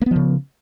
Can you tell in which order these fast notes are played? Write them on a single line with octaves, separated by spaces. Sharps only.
A#3 B3 F3 C#3